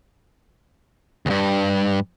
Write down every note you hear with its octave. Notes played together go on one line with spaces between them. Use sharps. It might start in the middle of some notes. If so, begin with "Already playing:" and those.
D2 G2